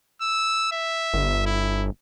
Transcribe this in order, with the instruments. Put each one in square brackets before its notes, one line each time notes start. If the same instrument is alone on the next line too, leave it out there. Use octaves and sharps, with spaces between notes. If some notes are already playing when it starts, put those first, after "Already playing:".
[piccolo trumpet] E6
E5
[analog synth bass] G1
[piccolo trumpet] E4